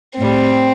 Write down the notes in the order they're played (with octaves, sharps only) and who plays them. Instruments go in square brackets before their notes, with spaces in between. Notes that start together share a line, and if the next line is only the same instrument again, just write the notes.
[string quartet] A2 G3 C4